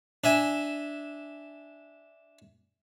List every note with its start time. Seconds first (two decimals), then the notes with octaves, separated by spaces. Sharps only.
0.24 D4 E5 G#5